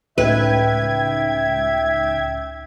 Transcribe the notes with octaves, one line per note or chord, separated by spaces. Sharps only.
C#2 A2 C#4 D#4 B4 E5 G5 G#6